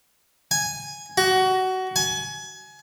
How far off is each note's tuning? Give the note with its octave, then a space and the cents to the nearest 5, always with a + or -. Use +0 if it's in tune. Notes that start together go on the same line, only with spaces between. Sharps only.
G#5 +0
F#4 +20
G#5 +25